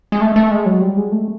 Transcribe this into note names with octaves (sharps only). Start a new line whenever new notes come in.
G#3
A3
A3
G#3
F#3
G3
G#3
A3